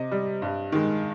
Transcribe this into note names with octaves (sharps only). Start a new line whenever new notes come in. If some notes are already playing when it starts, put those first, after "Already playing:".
Already playing: C3 D#5
G3
G2
D#3 G#3